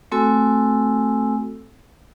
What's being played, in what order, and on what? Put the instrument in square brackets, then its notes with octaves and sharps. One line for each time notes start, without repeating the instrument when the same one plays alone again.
[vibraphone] A3 C4 F#4 A4 G#5 E6